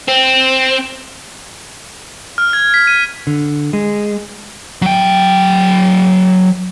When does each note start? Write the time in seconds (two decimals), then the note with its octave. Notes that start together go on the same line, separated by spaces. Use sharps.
0.08 C4
2.38 F6
2.53 G#6
2.74 B6
2.87 D#7
3.27 D3
3.73 G#3
4.82 F#3 G5